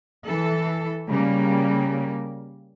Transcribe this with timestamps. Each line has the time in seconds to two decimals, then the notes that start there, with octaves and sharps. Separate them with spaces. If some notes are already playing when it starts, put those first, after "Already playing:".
0.25 E3 A4
1.08 C#3 G3 A#3